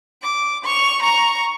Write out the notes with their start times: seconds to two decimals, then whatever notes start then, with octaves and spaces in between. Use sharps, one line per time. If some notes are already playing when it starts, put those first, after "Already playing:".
0.22 D6
0.64 C#6 F7
1.02 A#5 C#6